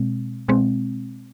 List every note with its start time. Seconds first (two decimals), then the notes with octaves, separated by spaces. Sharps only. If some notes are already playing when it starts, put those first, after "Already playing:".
Already playing: B2 G#3 C4
0.48 B2 G#3 C4